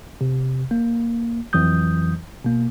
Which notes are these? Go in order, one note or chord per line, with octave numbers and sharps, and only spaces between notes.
C3
A#3
F2 E3 F#3 D#6 G6
B2 A#3